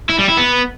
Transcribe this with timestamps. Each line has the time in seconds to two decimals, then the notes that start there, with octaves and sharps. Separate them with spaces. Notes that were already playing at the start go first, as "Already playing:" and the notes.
0.10 E4
0.19 G3
0.28 E4
0.38 B3